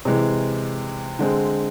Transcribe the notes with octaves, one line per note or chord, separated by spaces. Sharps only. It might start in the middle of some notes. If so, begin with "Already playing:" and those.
C3 E3 G#3
D3 G#3 C4 G#4